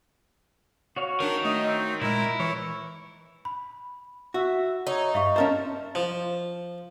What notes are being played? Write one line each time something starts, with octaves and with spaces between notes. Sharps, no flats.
F#4 C#5 F5
D#3 D4 A#4
A3 D#5
C4
A#2 G#3 E4 A#4
E3 C#5
B5
F#4 E5
D#4 C#5
G2 E5 F5 C#6
C#4 A#4 C5 E5 A5
F3